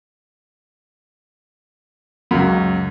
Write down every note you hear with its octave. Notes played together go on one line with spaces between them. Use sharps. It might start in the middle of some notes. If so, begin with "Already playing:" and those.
C#2 F#2